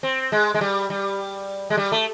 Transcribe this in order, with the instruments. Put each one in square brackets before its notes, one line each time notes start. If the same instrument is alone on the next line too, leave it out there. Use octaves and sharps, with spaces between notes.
[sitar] C4
G#3
G#3
G3
G3
G#3
G3
A3